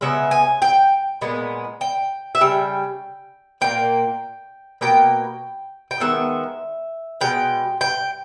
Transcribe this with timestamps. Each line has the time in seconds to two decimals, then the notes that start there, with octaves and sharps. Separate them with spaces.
0.01 C#3 G#3 B3 E5
0.31 G#5
0.62 G5
1.21 A#2 G#3 B3
1.81 G5
2.35 E5
2.41 C#3 G3 G5
3.61 A#2 A#3 G5
4.81 B2 A#3 G5
5.91 G5
6.00 D#3 G#3 B3 E5
7.21 B2 G#3 G5
7.81 G5